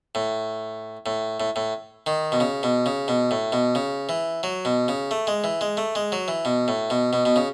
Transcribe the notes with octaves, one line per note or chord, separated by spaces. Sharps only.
A2
A2
A2
A2
D#3
B2
C#3
B2
C#3
B2
A2
B2
C#3
E3
F#3
B2
C#3
A3
G#3
E3
G#3
A3
G#3
F#3
E3
B2
A2
B2
B2
B2
C#3